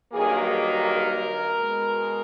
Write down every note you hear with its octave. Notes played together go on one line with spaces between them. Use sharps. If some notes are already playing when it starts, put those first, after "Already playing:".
G2 D#3 F#3 A#3 G#4
A#4
B2 G#3